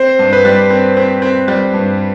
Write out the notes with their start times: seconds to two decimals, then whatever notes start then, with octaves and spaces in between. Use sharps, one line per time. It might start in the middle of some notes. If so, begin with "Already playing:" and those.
Already playing: C4 C5
0.19 G2
0.33 B4
0.45 G3
0.70 C4
0.97 C4
1.22 C4
1.48 G3
1.74 G2